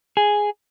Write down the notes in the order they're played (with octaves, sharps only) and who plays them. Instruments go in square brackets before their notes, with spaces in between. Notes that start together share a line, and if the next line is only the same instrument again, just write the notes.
[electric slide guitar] G#4